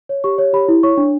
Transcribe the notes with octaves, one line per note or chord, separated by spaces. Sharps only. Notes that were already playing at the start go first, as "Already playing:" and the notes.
C#5
G4 C#6
C#5
G4 B5
E4
C#5 C#6
D4